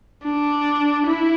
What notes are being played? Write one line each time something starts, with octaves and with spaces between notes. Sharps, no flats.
D4
E4